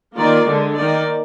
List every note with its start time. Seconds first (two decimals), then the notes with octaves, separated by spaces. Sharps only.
0.15 D#3 A#3 F4 A#4 D5
0.46 D3 G#3 D4
0.76 D#3 A#3 D#4 A#4 D5